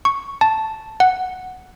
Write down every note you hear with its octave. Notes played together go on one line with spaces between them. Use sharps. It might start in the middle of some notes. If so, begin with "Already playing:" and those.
C#6
A5
F#5